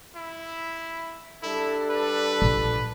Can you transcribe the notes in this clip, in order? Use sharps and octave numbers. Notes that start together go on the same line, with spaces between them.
E4
G3 D4 E4 A4
B4
A#1